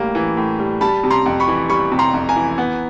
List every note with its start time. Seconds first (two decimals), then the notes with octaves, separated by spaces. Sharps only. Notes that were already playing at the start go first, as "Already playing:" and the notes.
Already playing: A2 E3 G3 A#3
0.15 E3
0.37 A2
0.59 G3
0.81 G3 A5 B5
1.04 C3
1.11 A#5 C6
1.26 F2
1.40 B5 C#6
1.48 E3
1.69 G3 B5 C#6
1.92 C3
1.99 A#5 C6
2.14 F2
2.29 G#5 A#5
2.36 E3
2.58 B3